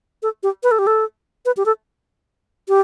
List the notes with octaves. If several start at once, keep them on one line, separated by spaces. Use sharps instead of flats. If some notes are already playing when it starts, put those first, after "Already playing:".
A4
G4
B4
A4
G4
A4
B4
G4
A4
G4